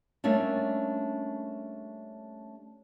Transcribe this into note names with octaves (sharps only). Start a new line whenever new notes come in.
G3 A3 A#3 C#4 D4